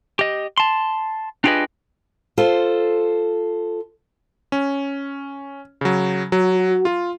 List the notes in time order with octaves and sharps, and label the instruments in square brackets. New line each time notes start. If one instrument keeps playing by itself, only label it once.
[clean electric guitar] G4 D#5
A5 C6
D4 F4 G4 G#4 B4 D#5
[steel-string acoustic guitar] F4 A4 C5
[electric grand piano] C#4
C#3 F#3
[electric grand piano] F#3 [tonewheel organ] F#4
[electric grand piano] F4